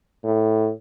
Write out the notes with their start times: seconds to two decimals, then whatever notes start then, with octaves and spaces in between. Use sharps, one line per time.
0.23 A2